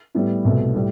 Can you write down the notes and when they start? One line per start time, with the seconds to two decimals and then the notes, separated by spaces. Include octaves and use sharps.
0.15 A2 G3 B3 E4
0.45 C2 B2 A3
0.75 A2 G3